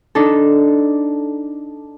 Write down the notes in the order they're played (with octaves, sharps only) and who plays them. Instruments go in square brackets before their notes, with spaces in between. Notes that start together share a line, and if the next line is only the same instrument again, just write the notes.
[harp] D4 D#4 A4